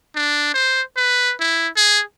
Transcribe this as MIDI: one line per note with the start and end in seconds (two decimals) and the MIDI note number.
0.15 0.52 62
0.54 0.82 72
0.97 1.34 71
1.40 1.68 64
1.76 2.02 68